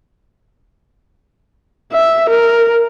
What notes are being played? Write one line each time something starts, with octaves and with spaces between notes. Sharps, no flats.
E5
A#4